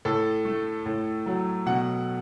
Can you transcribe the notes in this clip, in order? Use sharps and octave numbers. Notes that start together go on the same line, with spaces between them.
A2 A4
A3
A2
F#3
B2 F#5